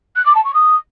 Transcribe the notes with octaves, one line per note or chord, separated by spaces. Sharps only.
F#6
D6
A5
C#6
D#6